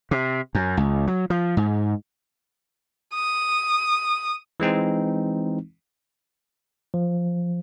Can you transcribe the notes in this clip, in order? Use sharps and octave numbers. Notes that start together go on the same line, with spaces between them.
C3
F#2
C#2
F#3
F3
G#2
D#6
E3 G#3 C4 D#4
F3